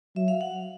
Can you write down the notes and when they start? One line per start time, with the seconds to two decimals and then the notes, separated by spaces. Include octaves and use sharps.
0.16 F#3 E5
0.28 F5
0.41 F#5